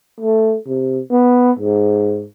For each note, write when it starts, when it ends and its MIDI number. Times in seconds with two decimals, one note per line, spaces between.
0.20 0.55 57
0.67 0.99 48
1.11 1.52 59
1.59 2.25 44